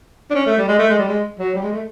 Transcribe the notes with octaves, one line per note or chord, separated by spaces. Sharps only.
D4
C#4
A3
G3
G#3
A3
G#3
G3
G#3
F#3
G3
G#3
A3